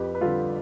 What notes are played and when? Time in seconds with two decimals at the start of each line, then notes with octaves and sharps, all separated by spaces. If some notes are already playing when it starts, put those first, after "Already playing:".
Already playing: F2 G4 B4
0.15 B4
0.21 D3 G3 F4 A4